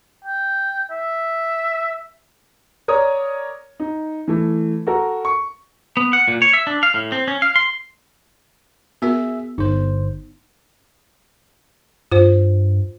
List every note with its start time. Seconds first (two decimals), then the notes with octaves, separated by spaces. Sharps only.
0.25 G5
0.91 E5
2.88 A#4 C#5 D5 D#6
3.80 D#4
4.28 E3 A3
4.87 F#4 A4 A#4
5.25 C#6
5.97 B3
6.13 F#5
6.28 A#2
6.42 C#5
6.53 E5
6.67 D4
6.83 F5
6.94 A2
7.12 C4
7.28 C#4
7.42 F5
7.56 C6
9.02 B3 F#4 G#4 A#4 E5
9.58 G1 D#4 C5
12.11 G2 F4 C5